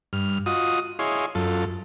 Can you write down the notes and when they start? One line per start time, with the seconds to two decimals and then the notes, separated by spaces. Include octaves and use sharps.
0.13 G2 F6
0.46 F4 F#4 D#5 D#6
0.99 E4 G#4 C#5 D#5 F5 C6
1.35 F#2 F4 A4